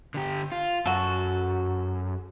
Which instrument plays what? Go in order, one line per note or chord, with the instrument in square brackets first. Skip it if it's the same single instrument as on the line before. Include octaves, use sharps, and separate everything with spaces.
[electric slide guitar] D3 G4
F4
[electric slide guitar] F#2 [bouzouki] F#4 A4